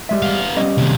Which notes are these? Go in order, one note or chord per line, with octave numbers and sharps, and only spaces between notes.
G3 G#3 E5
B3 F5
G3 C#4 D#5
D#2 C3